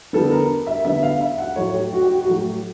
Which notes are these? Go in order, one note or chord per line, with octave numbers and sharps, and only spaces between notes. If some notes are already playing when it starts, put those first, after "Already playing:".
D3 G3 B3 A4
A#4
E5
D3 G3 B3 E5
F5
E5
F#5
A2 F#3 A3 C#5
G4
F#4
G4
F#4
F#4
A2 F#3 A3 G4